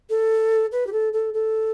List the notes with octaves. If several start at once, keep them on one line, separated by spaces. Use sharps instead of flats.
A4
B4
G4
A4
A4
A4